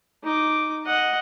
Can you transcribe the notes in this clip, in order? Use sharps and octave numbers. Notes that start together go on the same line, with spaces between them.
D#4 D6
D#5 F#5